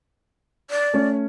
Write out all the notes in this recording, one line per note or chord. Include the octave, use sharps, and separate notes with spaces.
D5
A3 C#4